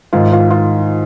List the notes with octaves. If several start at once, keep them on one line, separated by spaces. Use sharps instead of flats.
G#2 D#3 F4
F4
F4